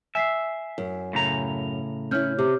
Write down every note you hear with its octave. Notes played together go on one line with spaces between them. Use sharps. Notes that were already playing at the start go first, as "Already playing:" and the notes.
E5 G#5 B6 C7
F#2
A2 C#3 A#5
C#4 E4 C#5 F6 G6
C3 G4